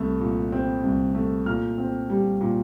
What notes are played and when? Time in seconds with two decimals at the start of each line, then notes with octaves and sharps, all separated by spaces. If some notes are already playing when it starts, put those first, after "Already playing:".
Already playing: C2 A3
0.20 A#2
0.52 C4
0.83 C2
1.15 A3
1.46 A#2 F6
1.78 C4
2.10 G3
2.41 A#2